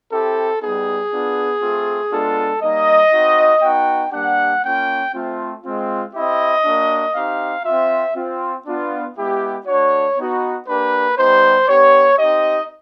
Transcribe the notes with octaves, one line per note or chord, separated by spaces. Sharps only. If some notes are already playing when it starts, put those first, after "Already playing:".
C4 E4 G4 A4
G3 B3 D#4 G#4
B3 D4 F4
A3 C4 F4
G#3 B3 D4 F4 A4
G3 A#3 D#4 D#5
C4 D#4 F#4
B3 D#4 F#4 G5
G3 A#3 D4 G4 F#5
A#3 C#4 F4 G5
A3 C4 F4
G#3 C4 F4
C4 E4 G4 D#5
A#3 D4 F#4
C4 D#4 G4 F5
C4 F4 E5
C4 F4
B3 D4 F4
G#3 B3 E4 G4
A3 D4 F#4 C#5
B3 D#4 F#4
A#3 D4 G4 B4
G3 B3 D#4 G4 C5
B3 D4 G4 C#5
C4 D#4 G4 D#5